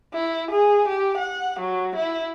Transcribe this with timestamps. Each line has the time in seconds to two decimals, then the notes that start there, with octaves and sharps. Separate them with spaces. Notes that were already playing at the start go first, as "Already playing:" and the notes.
0.14 E4
0.51 G#4
0.88 G4
1.18 F#5
1.60 F#3
1.96 E4